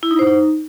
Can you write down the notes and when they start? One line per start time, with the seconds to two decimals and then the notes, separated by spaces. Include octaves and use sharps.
0.03 E4
0.11 D#4
0.19 C5
0.27 D#4